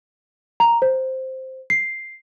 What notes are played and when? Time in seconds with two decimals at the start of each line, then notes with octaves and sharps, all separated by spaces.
0.60 A#5
0.82 C5
1.70 C7